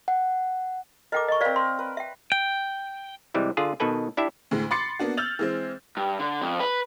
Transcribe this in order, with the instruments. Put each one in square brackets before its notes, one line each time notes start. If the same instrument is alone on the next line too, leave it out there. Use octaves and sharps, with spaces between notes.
[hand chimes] F#5
[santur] A4 A#4 [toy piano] D#5 G5 D6
[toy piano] D#5 C#6
[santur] C4 A#4 [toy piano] D5 F5
[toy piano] C6
[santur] B4
[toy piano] E5 G5
[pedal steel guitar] G5
[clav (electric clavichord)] C3 E3 G3 G#3
D3 F4 G#4
B2 D#3 A4 B4 G#5
D4 E4 G4 E5
[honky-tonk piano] D2 A2 G#3
B5 C6 D6 A6 C7 C#7
A#3 B3 D4 F#4
E6 F6 G6 A6 F7 F#7
E3 G#3 C4
[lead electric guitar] G2
D3
F2
B4